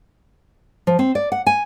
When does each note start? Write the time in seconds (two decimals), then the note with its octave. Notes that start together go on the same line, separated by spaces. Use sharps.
0.87 F3
0.99 C4
1.15 D5
1.32 F#5
1.46 G#5